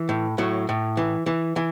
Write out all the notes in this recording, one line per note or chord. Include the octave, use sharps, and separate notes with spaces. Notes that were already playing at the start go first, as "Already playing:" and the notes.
Already playing: E3
A2
A2 F#3
A2
E3
E3
E3